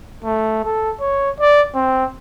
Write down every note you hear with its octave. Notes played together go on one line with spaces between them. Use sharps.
A3
A4
C#5
D5
C4